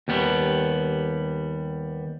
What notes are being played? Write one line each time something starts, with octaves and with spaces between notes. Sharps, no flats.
D#2 G3 B3